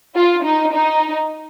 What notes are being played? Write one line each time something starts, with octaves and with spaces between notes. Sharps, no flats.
F4
D#4
D#4